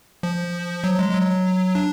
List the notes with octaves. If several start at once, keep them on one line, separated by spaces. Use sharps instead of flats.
F3
F#3
G#3
G#3
F#3
D4